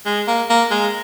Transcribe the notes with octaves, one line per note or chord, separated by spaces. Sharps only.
G#3
A#3
A#3
G#3